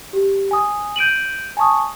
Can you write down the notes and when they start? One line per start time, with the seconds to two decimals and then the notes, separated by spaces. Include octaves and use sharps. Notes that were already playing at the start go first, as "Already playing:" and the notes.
0.13 G4
0.51 G#5 D#6
0.96 G6 D7 D#7 F#7
1.57 G#5 A5 C#6 D#6